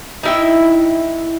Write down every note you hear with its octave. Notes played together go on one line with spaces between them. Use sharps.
D#4 E4 G5